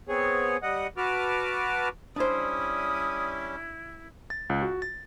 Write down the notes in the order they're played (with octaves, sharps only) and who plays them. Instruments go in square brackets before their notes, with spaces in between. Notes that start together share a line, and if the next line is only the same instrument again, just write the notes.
[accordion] B3 C4 G#4 C#5
G3 D#5 F#5
F#4 B4 A5 D6 F6
[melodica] G3 C#4 [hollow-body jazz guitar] D4 C5 [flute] E4 [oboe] D#6
[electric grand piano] A6
C#2
F#4
A6